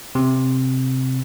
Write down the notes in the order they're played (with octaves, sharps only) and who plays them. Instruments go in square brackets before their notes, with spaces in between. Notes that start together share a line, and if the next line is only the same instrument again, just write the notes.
[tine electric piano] C3